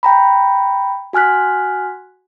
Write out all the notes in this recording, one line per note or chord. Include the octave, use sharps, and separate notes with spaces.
G5 A#5 B5
F#4 G#5 F6 F#6 B6